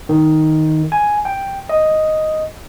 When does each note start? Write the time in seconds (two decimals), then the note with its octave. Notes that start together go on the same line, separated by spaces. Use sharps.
0.09 D#3
0.92 G#5
1.25 G5
1.69 D#5